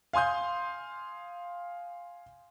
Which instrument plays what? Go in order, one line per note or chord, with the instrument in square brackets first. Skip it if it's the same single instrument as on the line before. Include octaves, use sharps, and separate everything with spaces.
[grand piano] F5 G#5 C6 D#6 G6